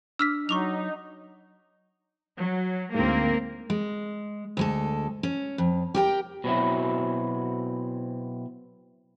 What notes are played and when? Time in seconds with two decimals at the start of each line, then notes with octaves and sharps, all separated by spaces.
0.19 D4 E6 F6 B6
0.49 F#3 D#4 C#6 D6 F7
2.37 F#3
2.95 D2 G#2 A#3 C4 A#4
3.70 G#3
4.57 D2 G#3 A4
5.23 C#4
5.58 F2
5.94 G4 A#4 G5
6.44 B2 F#3 C4 E4